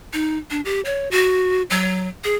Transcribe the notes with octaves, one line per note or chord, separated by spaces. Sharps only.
D#4
D4
G4
C#5
F#4
F#3
G#4